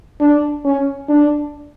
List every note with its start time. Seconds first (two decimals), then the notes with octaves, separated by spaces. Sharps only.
0.20 D4
0.65 C#4
1.09 D4